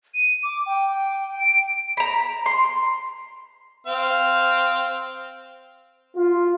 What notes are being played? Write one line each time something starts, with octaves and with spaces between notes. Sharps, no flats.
D#7
D6
G5
D7
A#5 B5
C6
C4 F5
F4